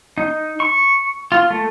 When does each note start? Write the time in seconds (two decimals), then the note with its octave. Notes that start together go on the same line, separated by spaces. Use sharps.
0.18 D#4
0.60 C#6
1.32 F4
1.50 A3